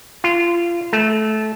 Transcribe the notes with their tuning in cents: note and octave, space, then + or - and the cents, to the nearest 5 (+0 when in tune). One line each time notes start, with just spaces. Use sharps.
F4 -25
A3 -20